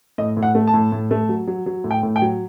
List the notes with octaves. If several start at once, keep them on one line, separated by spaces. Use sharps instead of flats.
A2 D#5
A2
F#5
A3
A5
A2
A2
A3
F#3
F#3
F#3
A2
G5
A2
G5
F#3